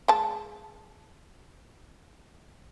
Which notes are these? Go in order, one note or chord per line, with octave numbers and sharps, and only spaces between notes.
G#3 A5